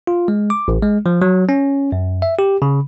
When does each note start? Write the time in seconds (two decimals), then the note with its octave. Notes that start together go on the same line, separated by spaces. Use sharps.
0.07 F4
0.28 G#3
0.50 D6
0.68 A1
0.83 G#3
1.06 F3
1.22 F#3
1.49 C#4
1.92 F#2
2.22 E5
2.39 G4
2.62 C#3